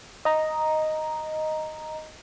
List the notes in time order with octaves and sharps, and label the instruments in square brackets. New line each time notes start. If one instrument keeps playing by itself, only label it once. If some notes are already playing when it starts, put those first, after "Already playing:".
[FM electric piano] D#5 A#5